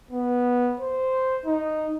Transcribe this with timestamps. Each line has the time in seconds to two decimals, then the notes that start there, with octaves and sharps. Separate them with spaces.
0.11 B3
0.80 C5
1.46 D#4